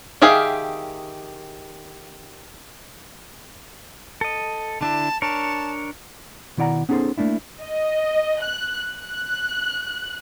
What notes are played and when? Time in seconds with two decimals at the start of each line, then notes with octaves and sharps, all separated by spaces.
0.22 D#3 G4 G#4 E5 F5
4.21 A4 D#5
4.81 D3 D4 E4 A5
5.22 D4 A#4 C#5 A5
6.57 B2 D#3 E4 D5 F#5 A#5
6.89 B3 C#4 D#4 G#4 A4 C5
7.18 A3 A#3 D4 E4
7.61 D#5
8.42 F#6
8.97 F#6